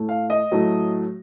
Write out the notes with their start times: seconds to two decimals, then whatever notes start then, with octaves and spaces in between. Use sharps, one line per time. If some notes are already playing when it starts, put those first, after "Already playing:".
Already playing: A2 A3
0.09 F5
0.30 D#5
0.51 A2 F#3 A3